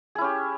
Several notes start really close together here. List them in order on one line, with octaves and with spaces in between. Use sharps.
G#4 E4 C#4 G4